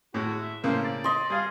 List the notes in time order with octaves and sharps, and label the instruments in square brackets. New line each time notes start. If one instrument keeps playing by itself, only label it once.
[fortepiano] A2 G#3 [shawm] F#4
[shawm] E5
[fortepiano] A2 C#3 A#3 [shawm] C5
[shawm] D5
[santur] D#5 C6
[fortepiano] G3 F5 [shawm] G#4